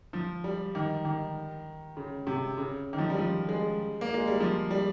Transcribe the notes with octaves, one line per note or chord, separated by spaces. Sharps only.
F3
G3
D#3
D#3
C#3
C3
C#3
D#3
F3
G3
F3
G#3
A#3
G#3
G3
F3
G3